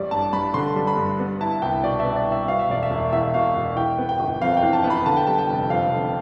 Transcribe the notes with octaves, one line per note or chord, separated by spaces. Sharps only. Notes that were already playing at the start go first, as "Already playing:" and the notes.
Already playing: A1 G3 D5
G2 A5
G2 B5
D3 C6
G3
B5
G2
B3
E4 A5
C2 G5
B2 D5
B3 E5
D5
E4
E5
B2 F5
E5
E1 D5
E5
E1
E2 E5
B2 F5
E1
E3 G5
B3
G5
G1
F2 F5
G5
E3
A5
B3
B5
D3 A5
G5
G3 A5
G5
F1
F2 F5
D3